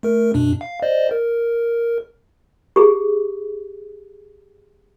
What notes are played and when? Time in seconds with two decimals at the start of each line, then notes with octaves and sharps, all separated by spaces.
0.03 A3 A#4
0.34 F#2 B2 D4
0.61 F5
0.82 C5 D5 D#5
1.11 A#4
2.76 G4 G#4